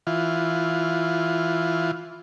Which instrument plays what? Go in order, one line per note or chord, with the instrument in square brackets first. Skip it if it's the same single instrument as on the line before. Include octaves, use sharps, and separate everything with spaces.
[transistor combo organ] E3 F4